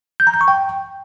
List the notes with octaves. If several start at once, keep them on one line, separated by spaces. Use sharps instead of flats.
G6
A#5
G6
C#6
G5